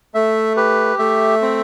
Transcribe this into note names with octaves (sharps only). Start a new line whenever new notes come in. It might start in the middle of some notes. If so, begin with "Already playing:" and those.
A3 E5
G4 B4
A3 E5
C4